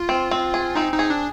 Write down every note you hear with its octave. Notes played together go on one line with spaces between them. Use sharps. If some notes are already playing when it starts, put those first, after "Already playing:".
Already playing: F4
C4
C4
G#4
C4 D#4
D#4
G#4
D4